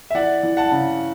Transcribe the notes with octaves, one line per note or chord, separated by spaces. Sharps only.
E5
E3 D5 F#5
E3
F#5 A5
C#3